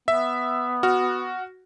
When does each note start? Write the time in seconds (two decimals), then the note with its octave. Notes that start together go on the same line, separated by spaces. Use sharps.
0.08 B3 E5
0.83 F#4 F6